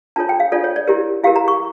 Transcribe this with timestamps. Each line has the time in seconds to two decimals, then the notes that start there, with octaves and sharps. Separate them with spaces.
0.16 D4 F4 A4 C#5 A5
0.29 G5
0.40 F5
0.52 D4 F4 A4 C#5 D5
0.64 C#5
0.76 D5
0.87 E4 G4 A#4
1.23 E4 G4 A#4 F5
1.36 A#5
1.48 C#6